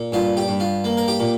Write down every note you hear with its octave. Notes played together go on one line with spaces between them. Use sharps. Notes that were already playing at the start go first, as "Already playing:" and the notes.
Already playing: A#2
G2 F4
G4
G2
F4
A#3
A#4
G4
A#2